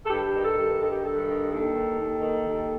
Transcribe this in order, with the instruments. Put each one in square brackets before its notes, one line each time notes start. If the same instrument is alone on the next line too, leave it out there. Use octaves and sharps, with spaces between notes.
[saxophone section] A4
G2 G4
D#3
A4
G2
D#3 A4
G4
G2 A4
D#3
D#2 A4
D#3
D#2
D#3
D#2